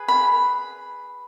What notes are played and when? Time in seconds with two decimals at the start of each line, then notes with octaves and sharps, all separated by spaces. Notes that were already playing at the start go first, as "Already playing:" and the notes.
Already playing: G#4 B4
0.08 B5